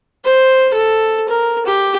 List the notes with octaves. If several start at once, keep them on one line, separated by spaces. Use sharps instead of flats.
C5
A4
A#4
G4